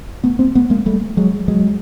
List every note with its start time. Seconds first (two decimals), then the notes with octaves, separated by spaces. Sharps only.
0.24 A3 B3
0.39 A#3 C4
0.55 A3 B3
0.70 G#3 A#3
0.86 G3 A3
1.17 F#3 G#3
1.48 F#3 G#3